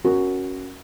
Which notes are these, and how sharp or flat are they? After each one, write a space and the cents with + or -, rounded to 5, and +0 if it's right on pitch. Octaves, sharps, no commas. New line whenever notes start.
C#4 -5 F#4 +0 A#4 +0